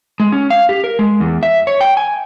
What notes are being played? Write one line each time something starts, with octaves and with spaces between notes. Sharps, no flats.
G#3
C#4
F5
G4
A#4
G#3
E2
E5
C#5
G5
G#5